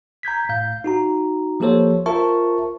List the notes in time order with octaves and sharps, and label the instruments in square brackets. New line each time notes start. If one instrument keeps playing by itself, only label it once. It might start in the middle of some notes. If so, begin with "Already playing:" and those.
[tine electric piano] A#5 G6 G#6 B6
A2 F5 G6
D#4 F#4 A#5
F3 A#3 G4 A4 C5 C#5
F4 A#4 C5 E5 A5 C#6